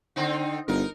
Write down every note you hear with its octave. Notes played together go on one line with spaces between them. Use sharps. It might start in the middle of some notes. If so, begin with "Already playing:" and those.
D3 C4 D#4
G1 D#4 A#4